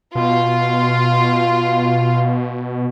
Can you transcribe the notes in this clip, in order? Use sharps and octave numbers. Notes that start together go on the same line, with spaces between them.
B2 F4